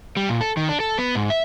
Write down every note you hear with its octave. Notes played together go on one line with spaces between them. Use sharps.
G3
A#2
A4
D#3
D4
A4
B3
G#2
E5